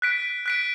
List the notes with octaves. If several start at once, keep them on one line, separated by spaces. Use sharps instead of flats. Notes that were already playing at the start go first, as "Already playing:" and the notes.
F#6 B6 D7
F#6 B6 D7